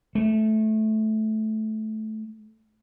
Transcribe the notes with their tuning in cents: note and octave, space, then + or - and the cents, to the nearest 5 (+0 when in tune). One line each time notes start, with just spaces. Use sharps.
A3 -15